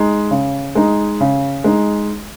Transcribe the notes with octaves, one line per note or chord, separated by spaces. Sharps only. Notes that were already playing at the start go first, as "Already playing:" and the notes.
Already playing: G#3 D#4
C#3
G#3 D#4
C#3
G#3 D#4